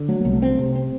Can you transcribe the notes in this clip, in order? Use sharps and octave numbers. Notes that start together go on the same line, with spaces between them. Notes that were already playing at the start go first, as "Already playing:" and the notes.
Already playing: D3
F#3 A3
C2 A#3
A3
C4
C3
C4